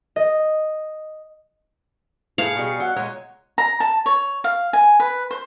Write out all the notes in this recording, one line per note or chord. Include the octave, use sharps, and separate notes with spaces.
D#5
A2 G#4 F5 C#7
B2 G3 G#4
F#3 F#5
A#2 G#3 C#5
A#5
A5
C#5
F5
G#5
B4
C5